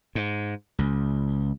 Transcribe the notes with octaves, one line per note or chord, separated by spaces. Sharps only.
G#2
C#2